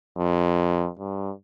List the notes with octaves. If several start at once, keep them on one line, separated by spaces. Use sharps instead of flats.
F2
G2